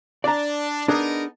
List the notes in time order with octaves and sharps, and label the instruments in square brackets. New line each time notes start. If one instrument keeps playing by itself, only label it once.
[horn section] D4 [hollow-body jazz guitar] D5 A#5
[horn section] B3 D#4 A#4 [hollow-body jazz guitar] D4 G#4